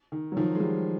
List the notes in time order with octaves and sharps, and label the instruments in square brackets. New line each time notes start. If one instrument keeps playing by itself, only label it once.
[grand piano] D#3
F#3
D#3 F3
G#3
F3 G3